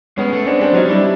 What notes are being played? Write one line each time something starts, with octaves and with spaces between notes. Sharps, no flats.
G#3 B3 C#4
A3
G#3 C4 D4
G3 C4 D4
F#3 C#4 D#4
G3 D4 E4